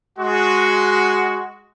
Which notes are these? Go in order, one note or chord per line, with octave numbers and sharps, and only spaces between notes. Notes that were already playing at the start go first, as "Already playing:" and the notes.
G#3 F#4